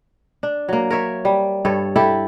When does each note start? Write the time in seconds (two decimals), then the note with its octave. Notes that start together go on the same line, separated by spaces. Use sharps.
0.43 D4
0.68 F#3 A#3
0.90 A#4 C#5 E5
1.25 G3
1.65 G2 A4 C#5
1.96 E4 G4 A4 E5